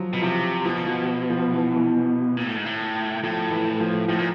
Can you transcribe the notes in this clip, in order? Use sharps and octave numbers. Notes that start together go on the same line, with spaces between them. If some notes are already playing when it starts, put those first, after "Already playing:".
Already playing: F3 F#3
B2
C3 F3
B2 F3
F3
F3
E3
E3
A#2
A2
G#2
A2
A2 F3
E3
F3
A2 F3
A#2